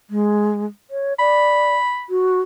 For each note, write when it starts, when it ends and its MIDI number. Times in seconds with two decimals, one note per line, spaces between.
0.10 0.65 56
0.90 1.13 73
1.19 1.75 74
1.19 2.06 83
2.09 2.39 66